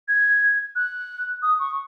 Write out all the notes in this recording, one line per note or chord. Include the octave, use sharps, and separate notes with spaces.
G#6
F#6
D#6
C#6